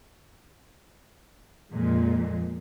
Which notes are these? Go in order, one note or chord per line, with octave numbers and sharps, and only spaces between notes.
F2 A#2 G#3